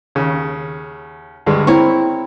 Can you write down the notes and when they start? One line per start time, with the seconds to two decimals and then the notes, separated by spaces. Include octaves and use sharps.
0.15 D#2 C#3
1.46 D2 G2 G#3
1.67 C4 E4 A#4 C#5